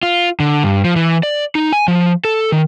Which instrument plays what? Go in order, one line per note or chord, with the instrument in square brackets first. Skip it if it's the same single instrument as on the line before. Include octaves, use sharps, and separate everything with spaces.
[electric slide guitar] F4
D3
G2
F3
E3
D5
D#4
G#5
F3
A4
D#3